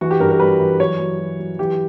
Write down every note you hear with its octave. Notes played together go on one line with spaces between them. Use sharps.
E3 F#4
G4
G2 A#4
A#4
G3 B4
E3
F#3 C#5
F#3
F#3
F#3
E3 G4